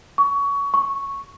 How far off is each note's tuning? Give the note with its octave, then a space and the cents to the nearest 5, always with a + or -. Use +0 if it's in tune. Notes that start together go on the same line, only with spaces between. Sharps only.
C#6 +20
C#6 -5